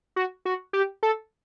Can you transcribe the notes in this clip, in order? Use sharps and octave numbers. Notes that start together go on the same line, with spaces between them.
F#4
F#4
G4
A4